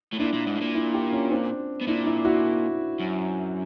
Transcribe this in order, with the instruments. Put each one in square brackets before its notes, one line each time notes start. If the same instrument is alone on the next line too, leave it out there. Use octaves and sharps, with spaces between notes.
[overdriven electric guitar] A2
[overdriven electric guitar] A#2 [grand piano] D4 E4
[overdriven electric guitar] A#2
G#2
A2
A#2
[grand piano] D4 E4
F4 G4
C#4
C4 D4
[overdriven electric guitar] B2
[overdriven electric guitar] A#2 [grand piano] D4 E4
[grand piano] D4 E4
E4 F#4
[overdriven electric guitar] F#2